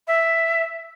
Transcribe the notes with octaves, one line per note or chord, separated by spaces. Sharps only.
E5